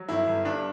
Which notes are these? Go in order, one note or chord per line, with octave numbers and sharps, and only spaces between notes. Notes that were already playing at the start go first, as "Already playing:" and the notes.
Already playing: F#3
G1 E4
G1
G2 D4